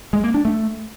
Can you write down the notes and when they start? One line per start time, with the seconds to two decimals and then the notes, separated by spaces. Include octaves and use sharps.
0.13 G#3
0.24 A#3
0.34 D4
0.45 A3